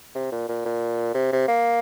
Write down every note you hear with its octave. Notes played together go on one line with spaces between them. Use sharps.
C3
A#2
A#2
A#2
C3
C3
A#3